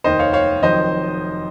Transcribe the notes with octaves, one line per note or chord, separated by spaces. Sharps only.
F1 D#2 D#3 C5 D#5
C#5 F5
C#5 F5
F1 F2 D#3 F#3 C5 D#5